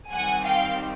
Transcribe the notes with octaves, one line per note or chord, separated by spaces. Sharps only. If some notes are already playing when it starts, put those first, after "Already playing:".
D#3 G3 C4 F#5 G#5
F5 G5